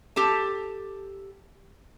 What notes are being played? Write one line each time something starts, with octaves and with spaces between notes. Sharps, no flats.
G4 A4 A5